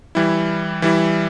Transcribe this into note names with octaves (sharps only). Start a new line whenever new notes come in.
E3 G3 E4
E3 G3 E4